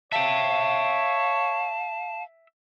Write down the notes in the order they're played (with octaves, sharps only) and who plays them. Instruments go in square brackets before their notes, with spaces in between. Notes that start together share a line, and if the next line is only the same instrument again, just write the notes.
[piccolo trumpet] C#5 [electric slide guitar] E5 G5 [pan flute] F5 [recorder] A5